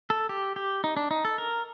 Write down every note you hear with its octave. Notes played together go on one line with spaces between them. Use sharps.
A4
G4
G4
D#4
D4
D#4
A4
A#4